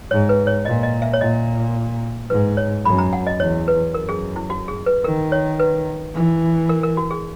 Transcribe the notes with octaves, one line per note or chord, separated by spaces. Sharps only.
G#2 C#5
B4
C#5
A#2 D#5
D#5
E5
C#5
A#2 D#5
G#2 B4
C#5
F#2 B5
A#5
F#5
D#5
E2 C#5
B4
F#2 A#4
G#4
E4
F#4
G#4
B4
D#3 A#4
C#5
B4
E3
A#4
A#4
F#4
G#4